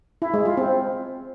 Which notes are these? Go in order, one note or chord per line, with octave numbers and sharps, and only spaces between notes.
E4
G#3
F4
C4